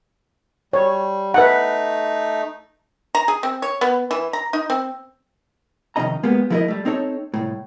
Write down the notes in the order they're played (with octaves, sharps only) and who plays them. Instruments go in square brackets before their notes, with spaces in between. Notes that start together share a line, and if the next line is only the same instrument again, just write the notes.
[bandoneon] G3 [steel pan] C#5
[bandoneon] A3 D#4 [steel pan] B4 F#5
[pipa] A#5
G#4
C4
C#5
B3
E3
A#5
D#4
C4
[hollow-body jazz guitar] C3 D#3 F3 C#4 D#5 A#5
G#3 A#3 B3 G4
F3 A3 E4 A4 A#4 D#5
G3 A3
C4 D#4 A4 C#5
C2 A2